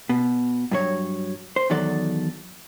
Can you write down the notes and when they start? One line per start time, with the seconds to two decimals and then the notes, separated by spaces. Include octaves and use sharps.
0.09 B2
0.71 G2 F#3 C#5
1.56 C5
1.70 E2 D#3 F#3 A4 D5